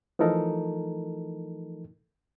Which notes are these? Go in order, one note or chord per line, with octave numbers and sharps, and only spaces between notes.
E3 F3 A3 D#4 A4 A#4